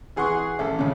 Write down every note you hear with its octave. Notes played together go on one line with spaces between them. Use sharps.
E3 G#4 F#5 C6 C#6
A1 A4
C#2 C#3